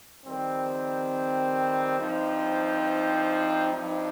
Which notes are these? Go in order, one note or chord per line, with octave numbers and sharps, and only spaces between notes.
F2 D#3 G3 C4
G2 F3 C4 D#4
G2 F3 C4 D#4